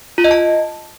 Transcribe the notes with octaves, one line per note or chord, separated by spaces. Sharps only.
F4
D#5
A5